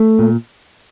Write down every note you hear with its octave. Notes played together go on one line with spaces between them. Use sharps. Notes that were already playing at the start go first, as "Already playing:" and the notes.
Already playing: A3
A#2